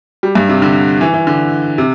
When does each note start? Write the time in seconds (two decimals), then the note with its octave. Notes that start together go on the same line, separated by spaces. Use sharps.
0.23 G3
0.35 G2
0.49 C3
0.62 D3
1.01 E3
1.14 E3
1.27 D3
1.78 C3